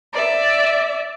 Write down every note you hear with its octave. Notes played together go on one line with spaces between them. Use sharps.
D5 E5